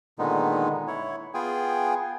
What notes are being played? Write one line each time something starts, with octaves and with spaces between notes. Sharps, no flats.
A#2 D3 D#3 G#3 B3 D#4
E4 C#5
B3 F4 G#4 G5 G#5